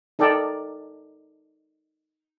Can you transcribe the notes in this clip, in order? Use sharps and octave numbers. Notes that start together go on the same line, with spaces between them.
D#4 A4 A#4 D5 G5